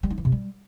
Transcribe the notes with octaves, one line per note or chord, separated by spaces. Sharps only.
G3
D#4
E3
C3
G3